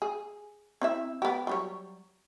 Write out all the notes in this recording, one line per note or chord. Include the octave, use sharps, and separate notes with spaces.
G#4
C4 E4 E5
B3 G4
F#3 G3 C#5